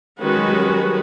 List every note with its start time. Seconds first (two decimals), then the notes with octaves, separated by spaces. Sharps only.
0.20 D#3 G#3 C#4 F#4 B4
0.36 F#3
0.47 F#3
0.53 G3
0.69 F#3